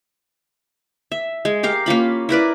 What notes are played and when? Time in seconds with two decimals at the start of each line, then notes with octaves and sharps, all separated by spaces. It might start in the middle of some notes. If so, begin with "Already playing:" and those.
1.12 E5
1.45 G#3
1.63 G4 A#4 F5
1.86 A#3 C#4 F4 B5
2.29 E4 A#4 B4 D5